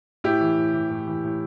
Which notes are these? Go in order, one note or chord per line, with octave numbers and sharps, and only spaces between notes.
A2 E4 G4
E3
A2
E3
A2
E3
A2